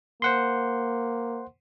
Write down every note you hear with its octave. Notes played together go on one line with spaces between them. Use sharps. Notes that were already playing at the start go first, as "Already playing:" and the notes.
A#3 C5 F#5 C6